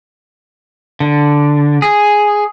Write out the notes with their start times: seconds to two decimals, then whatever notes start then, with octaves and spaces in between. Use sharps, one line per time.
1.00 D3
1.82 G#4